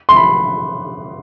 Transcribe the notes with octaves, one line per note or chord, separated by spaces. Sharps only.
C6
B5